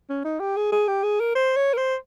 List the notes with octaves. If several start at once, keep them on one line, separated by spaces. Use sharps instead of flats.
C#4
D#4
G4
G#4
G#4
G4
G#4
A#4
C5
C#5
A#4
C5